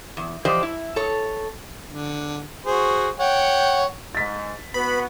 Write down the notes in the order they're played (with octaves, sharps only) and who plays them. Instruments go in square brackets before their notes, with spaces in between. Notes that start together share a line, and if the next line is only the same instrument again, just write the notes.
[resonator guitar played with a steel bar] E2
E3 F3 G4 C5 D5 D#5
E4
A4 C#5
[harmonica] D3
F#4 G#4 C5
C#5 F#5 G5
[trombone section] G#2 [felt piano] A6 B6
[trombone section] B3 F#4 [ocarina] B4 [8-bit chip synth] B5